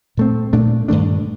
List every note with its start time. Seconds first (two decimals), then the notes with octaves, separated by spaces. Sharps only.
0.17 A#2 A3 C4
0.53 A#2 A3 D4
0.88 G2 D#3 A3 D4